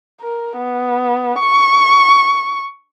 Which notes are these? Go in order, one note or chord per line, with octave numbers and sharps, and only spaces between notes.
A#4
B3
C#6